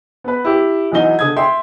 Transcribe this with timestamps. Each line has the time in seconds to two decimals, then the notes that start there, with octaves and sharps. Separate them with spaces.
0.24 B3 B4
0.45 E4 G4
0.92 B1 E3 F#3 D#4 D#5 G7
1.19 D3 D#6 G#6
1.37 E5 G5 C6